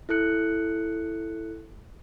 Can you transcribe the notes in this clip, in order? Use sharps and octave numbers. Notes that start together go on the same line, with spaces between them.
E4 A4 F#6 C#7